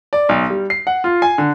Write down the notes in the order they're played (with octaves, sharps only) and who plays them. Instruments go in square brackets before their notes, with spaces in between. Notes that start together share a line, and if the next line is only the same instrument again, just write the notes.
[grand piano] D5
B1
G3
C7
F#5
F4
G#5
D3